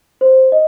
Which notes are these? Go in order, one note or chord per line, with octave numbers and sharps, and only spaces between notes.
C5
D#5